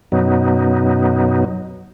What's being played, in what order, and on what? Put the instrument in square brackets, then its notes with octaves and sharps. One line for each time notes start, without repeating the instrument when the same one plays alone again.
[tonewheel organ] F#2 B2 F#3 B3 D#4